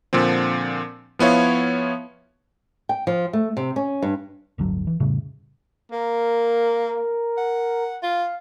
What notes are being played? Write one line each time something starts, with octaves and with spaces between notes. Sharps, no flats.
A#2 D3 F3 C4
F3 B3 E4 C#5 F5
G5
F3
A3
C3
C#4
G2
D1 G1 D3 F#3
E3
F2 A2 C#3 G3
A#3 A#4
F#5
F4 F5